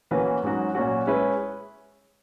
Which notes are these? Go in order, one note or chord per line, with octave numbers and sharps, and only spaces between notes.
E3 A#3 C#4 F#4 B4
G#2 F#3 C#4 F#4
A#2 F#3 C#4 F#4
G#3 C#4 E4 B4